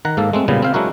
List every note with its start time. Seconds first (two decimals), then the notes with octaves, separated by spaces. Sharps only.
0.05 D#3 F#5 A#5
0.17 G#2 A#3 A4
0.33 G#3 A3 C4
0.48 A#2 C#3 G3 B3
0.62 C4 F5 G5
0.74 F#3 G#3 D4 E4 F#4 A#4